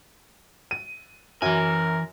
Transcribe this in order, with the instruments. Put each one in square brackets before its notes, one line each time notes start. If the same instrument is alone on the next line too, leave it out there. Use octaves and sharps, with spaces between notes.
[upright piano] D#7
[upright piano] F#2 [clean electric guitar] E3 G#5 [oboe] A#4